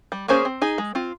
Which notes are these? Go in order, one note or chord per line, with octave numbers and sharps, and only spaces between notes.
G3
A#3 C#4 G#4 C5
C4
D#4 G#4
G#3
C4 F4